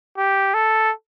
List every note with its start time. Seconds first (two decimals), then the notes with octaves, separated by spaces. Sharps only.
0.18 G4
0.54 A4